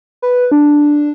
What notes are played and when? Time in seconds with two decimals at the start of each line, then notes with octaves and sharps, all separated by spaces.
0.22 B4
0.52 D4